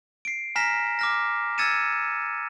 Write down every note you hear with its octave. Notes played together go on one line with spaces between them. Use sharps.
C7 D7
G#5 A#5 F6 A#6 B6 E7
D6 F6 A#6
E6 G#6 A6 C#7 D#7 E7